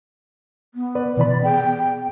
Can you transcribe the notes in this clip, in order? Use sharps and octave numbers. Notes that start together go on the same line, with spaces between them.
B3
B4 D5
B2 E3 D5 B5
B3 G#4 G5